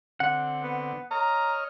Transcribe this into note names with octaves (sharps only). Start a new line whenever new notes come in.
D3 C4 F#5
B3
C#5 D#5 A#5 F6